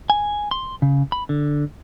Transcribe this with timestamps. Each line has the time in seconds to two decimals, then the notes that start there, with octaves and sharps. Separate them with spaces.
0.10 G#5
0.51 C6
0.82 C#3
1.12 B5
1.29 D3